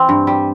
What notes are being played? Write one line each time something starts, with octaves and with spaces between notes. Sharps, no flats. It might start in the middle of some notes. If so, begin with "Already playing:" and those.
Already playing: E3 C4
G2
G3